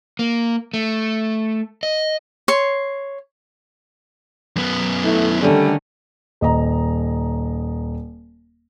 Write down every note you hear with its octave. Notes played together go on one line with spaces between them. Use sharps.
A#3
A3
D#5
C#5 C6
F#2 B3
A3 E4
D3 D#3 G3 A3 C#4
D#1 D#5 A#5